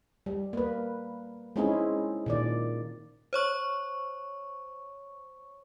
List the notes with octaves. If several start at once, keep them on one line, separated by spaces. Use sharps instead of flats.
G3
A#3 B4
G#3 C4 C#4 D#4 E4 G#4
A#2 D#3 D5
C5 C#5 C#6